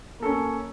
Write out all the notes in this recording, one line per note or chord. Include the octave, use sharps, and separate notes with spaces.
A#3 C#4 A4